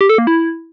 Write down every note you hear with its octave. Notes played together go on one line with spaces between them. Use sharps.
G4
A4
A#3
E4